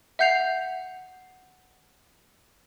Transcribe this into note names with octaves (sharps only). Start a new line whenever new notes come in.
E5 F#5 G6 C7 F7